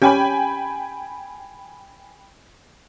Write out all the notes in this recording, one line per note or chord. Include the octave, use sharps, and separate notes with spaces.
C#4 G4 G5 G#5 B5